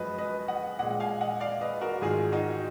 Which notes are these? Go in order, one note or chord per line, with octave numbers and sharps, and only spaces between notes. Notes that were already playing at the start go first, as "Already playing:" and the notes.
Already playing: F#2 F3 G#3 F#4 B4 D#5
B4 D#5
D#5 F#5
A#2 G#3 D#5 F#5
F#5
F5 G#5
D#5 F#5
D5 F5
B4 D#5
F#4 A#4
G#2 D#3 G#3 F4 G#4
D#4 F#4